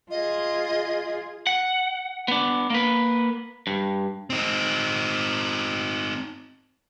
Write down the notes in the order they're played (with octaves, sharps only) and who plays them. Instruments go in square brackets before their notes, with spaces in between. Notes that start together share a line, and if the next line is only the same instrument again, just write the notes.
[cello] F4 G#4 [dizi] D#5
[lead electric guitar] F#5
B3 D4
A#3 B4
G2
C4 D#4